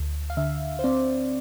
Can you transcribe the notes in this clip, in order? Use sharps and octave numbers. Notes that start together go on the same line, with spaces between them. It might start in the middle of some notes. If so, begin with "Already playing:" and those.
Already playing: D2
F5
D3 E5
C5
C4 D5